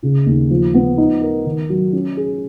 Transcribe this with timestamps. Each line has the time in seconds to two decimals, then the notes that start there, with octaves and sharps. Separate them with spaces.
0.03 C#3
0.26 D#2
0.50 F3
0.74 B3
0.98 D#4
1.22 A#4
1.46 D#3
1.70 F#3
1.93 C#4
2.17 G#4